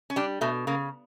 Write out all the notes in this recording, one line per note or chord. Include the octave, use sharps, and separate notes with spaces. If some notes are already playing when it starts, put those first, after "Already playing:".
C#4
G3 D4
B2 A3
C#3 A#3